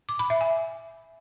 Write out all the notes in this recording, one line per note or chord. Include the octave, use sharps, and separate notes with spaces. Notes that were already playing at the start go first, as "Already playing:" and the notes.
D6
B5
E5
G#5